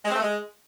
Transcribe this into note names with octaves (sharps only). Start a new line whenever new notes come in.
G#3
C4
A3
G#3